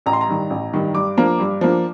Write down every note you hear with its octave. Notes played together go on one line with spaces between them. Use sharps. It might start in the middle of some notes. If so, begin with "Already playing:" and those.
A1 A#5
C6
A#5
G2 D#3
A1
G2 D#3
G2 D6
F3 A#3 D4
G2
F3 A#3 D4